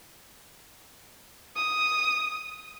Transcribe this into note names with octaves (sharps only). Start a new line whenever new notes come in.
D#6